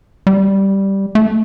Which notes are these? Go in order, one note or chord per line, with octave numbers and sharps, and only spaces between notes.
G3
A3